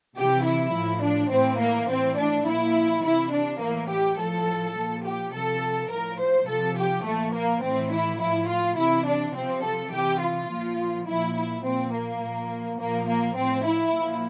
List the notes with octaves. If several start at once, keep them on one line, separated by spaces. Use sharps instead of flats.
C3 E3 G4
E4
A2 F3
D4
A2 E3 C4
A#3
A2 E3 C4
D4
A#2 F3 E4
C3 E3 E4
D4
A2 E3 A#3
G4
A2 F3 A4
A#2 F3
G4
C3 F3 A4
A2 F3 A#4
C5
C3 F3 A4
G4
A#2 F3 A3
A#3
A2 E3 C4
E4
A2 F3 E4
F4
C3 E3 E4
D4
C3 F3 C4
A4
C3 E3 G4
F4
A#2 F3
A#2 F3 E4
E4
A#2 F3 C4
A#3
A#2 F3
A#2 F3 A#3
A#3
A2 F3 C4
E4
A#2 F3